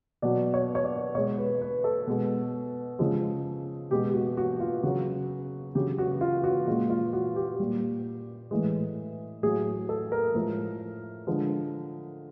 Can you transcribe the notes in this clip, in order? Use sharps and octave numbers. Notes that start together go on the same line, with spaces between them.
B2 F#3 D5
C#5
C#5
D5
B2 G#3 C#5
B4
B4
A4
B2 G#3
C#3 F3 G#3
B2 G#3 G4
F#4
F#4
F4
C#3 F#3 F#4
C#3 F#3 G4
F#4
F4
F#4
A#2 F3 G#3 F4
F4
F#4
G4
A#2 G3
A2 E3 G#3
A2 F#3 G#4
A4
A#4
A2 F3 G#3
D3 F3 G#3